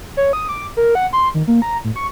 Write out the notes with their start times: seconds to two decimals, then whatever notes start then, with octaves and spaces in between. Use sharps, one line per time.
0.17 C#5
0.33 D#6
0.49 D6
0.77 A#4
0.95 F#5
1.13 C6
1.34 D#3
1.48 A#3
1.62 A#5
1.84 A2
1.96 C#6